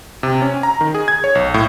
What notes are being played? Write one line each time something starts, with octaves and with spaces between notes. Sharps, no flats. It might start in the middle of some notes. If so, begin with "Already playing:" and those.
C3
C#4
A#5
D#3
G#4
G#6
C#5
B1
A2